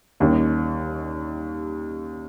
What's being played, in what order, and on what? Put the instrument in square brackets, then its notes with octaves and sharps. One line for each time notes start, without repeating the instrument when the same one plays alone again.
[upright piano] D#2 D#3 G3 C#4 G4